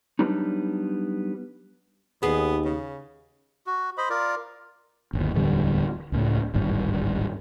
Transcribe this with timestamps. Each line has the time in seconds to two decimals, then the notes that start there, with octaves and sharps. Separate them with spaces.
0.19 F#3 G3 B3 D4 D#4
2.23 D#2 B3 G#4
2.65 C#3
3.67 F#4
3.98 C5 D#5 B5
4.10 F4 A#4 D5
5.13 G1 D#2
5.35 D1 E2 D3 G3
6.12 C#2 A2
6.54 D1 G#1 G2